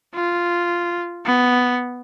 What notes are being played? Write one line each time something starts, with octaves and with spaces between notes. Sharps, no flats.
F4
B3